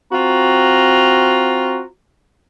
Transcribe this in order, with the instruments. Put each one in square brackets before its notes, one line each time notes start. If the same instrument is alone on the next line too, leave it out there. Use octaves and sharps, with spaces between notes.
[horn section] C4 F4 F#4 A#5